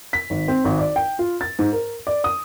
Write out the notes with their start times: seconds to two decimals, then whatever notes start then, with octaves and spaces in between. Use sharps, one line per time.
0.13 B6
0.30 G#1
0.48 C4
0.65 G#1
0.79 D5
0.96 G5
1.19 F4
1.41 A6
1.59 G#2
1.73 A#4
2.07 D5
2.24 D#6